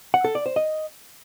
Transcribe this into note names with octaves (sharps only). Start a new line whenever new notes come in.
F#5
A4
D5
C5
D#5